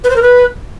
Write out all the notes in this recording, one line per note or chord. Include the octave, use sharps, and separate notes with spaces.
B4
C5
A#4
B4